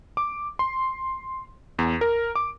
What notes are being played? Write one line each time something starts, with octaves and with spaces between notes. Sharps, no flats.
D6
C6
E2
A#4
D6